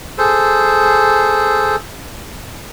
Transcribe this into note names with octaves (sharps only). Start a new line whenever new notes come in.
G#4 A4 C5